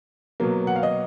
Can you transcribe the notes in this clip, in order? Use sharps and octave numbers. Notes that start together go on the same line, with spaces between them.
B2 F#3 A#3
F#5
F5
D#5